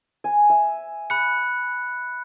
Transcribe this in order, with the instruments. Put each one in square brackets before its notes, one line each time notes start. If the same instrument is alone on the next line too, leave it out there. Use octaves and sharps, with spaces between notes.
[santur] G#5
E5
[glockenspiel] B5 F#6 C#7